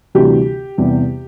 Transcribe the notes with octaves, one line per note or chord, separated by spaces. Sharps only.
D2 C3 E3 G3 G4
E2 C3 G3